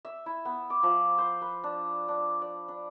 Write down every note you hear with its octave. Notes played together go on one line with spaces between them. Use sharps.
E5
E4
B3
D6
F3
C5
B4
D4
D4
D5
D4